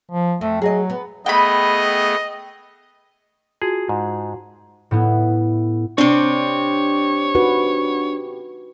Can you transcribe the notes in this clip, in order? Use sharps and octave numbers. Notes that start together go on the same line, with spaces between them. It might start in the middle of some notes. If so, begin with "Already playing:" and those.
F3
F2 A3
F#3 G#4 D#5
B3
A3 B3 G#4 D#5 G5 B5
F4 F#4 G#4 A5
G#2
A2 B3 E4
C3 C4 D4 C#5
D#4 F#4 B4